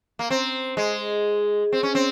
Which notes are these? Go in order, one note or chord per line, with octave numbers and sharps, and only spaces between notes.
A#3
C4
G#3
C4
C#4
C4